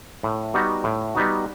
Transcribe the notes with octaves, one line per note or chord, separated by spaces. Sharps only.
A2
G3 B3 D#4 F#4
A2
G3 B3 D#4 F#4